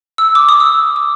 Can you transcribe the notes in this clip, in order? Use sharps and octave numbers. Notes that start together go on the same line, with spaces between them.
E6
D6
D#6
E6
D6